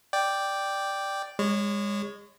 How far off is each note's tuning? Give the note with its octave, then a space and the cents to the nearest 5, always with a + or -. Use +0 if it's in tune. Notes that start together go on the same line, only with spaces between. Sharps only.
D5 +0 G5 +0
G#3 -30 C#5 +0